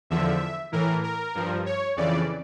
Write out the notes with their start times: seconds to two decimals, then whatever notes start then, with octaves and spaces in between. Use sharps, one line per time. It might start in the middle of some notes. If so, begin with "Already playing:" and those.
0.10 E2 D3 F3 E5
0.72 A2 E3 A#4
1.03 A#4
1.35 G2 F3
1.66 C#5
1.97 F2 C#3 E3 D5